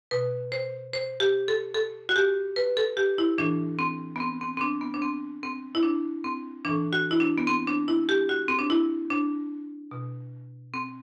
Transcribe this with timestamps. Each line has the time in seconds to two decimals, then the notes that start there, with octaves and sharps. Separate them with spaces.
0.11 B2 B4
0.52 C5
0.93 C5
1.20 G4
1.48 A4
1.74 A4
2.09 F#4
2.16 G4
2.56 B4
2.77 A4
2.97 G4
3.18 E4
3.38 A2 E3 D4
3.79 C4
4.16 B3
4.20 C4
4.41 C4
4.57 C4
4.61 D4
4.81 B3
4.94 D4
5.02 C4
5.43 C4
5.75 E4
5.83 D4
6.24 C4
6.65 A2 E3 D4
6.93 F#4
7.11 E4
7.20 D4
7.38 B3
7.47 C4
7.67 D4
7.88 E4
8.09 G4
8.29 F#4
8.48 C4
8.59 D4
8.70 E4
9.10 D4
9.91 B2
10.74 C4